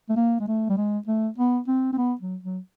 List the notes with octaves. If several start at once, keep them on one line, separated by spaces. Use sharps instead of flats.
A3
A#3
G#3
A3
G3
G#3
A3
B3
C4
C4
B3
F#3
F#3